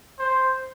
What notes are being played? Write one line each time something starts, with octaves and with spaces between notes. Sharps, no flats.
C5